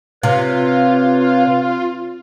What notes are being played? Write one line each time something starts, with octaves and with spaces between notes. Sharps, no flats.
C3 F4 B4 C#5